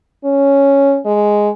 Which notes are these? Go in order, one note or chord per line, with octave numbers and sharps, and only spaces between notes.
C#4
G#3